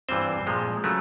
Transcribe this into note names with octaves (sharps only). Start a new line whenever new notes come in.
G2 E3 G3 C4 F4 C5
A#2 F3 G#3
C#3 F#3 A3